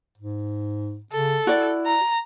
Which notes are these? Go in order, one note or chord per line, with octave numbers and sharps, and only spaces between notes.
G#2
C#3 A4
E4 F#4 D5
A#5